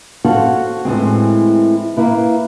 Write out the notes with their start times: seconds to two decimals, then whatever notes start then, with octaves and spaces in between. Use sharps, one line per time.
0.25 F#4 A4 C5 C#5 F5 F#5
0.85 A2 E3 G#3 C4
1.97 A#3 E4 B4